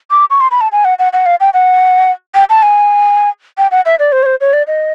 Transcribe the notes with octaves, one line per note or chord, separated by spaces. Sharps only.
D6
C#6
C6
B5
A5
G#5
F#5
F#5
F#5
F5
G5
F#5
G5
A5
G#5
G5
F#5
E5
D5
C5
C#5
C5
C#5
D5
D#5